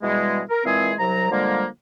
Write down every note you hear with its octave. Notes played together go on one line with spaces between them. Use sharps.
B2 E3 G3 G#3
A#4
A#2 E3 G#3 C4 G#4
C2 F#3 A#5
D3 F3 G3 G#3 A#3